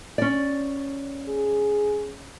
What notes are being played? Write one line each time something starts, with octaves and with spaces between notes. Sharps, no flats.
C#4 D5
G#4